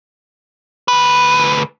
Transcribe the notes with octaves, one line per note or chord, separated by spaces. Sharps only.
D2 B4